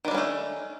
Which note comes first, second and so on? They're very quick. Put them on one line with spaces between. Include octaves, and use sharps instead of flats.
D#3 D4 G3 C#4 A3